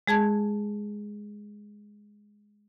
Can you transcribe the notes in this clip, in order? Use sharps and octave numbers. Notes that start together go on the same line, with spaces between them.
G#3 G#4 A5 G#6